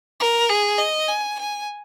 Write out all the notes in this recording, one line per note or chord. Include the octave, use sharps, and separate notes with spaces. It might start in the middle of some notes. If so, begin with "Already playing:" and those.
A#4
G#4
D#5
G#5
G#5